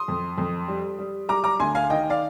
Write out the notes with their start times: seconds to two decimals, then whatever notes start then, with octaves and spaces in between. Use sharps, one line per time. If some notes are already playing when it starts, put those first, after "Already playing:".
Already playing: C6 D#6
0.08 F2
0.38 F2
0.68 G3
0.99 G3
1.28 G3 A#5 D6
1.44 A#5 D6
1.60 D2 G#5 C6
1.75 F5 G#5
1.90 D#3 D#5 G5
2.10 D5 F5